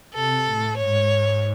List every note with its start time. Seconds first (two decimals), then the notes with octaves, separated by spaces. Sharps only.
0.14 C3 A4
0.46 A2
0.77 G#2 C#5